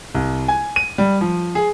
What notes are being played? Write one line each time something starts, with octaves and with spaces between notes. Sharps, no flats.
C2
G#5
D#7
G3
F3
G#4